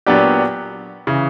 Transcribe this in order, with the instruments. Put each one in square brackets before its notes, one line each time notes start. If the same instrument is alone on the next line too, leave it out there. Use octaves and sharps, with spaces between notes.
[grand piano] A#2 F#3 B3 D4 G4
C#3 E3